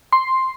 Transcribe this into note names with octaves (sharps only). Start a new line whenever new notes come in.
C6